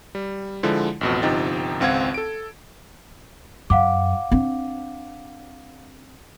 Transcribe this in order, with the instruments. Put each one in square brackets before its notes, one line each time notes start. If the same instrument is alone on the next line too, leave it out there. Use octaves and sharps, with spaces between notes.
[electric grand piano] G3
D3 F3 G#3 E4
A1 F2 B2
G1 C3 F3 D#4 G5 A6
G#1 C#2 C4 F5 F#5 G#6
A4 D7
[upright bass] F#2 [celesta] F5 F#5 D6
[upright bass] C4 D4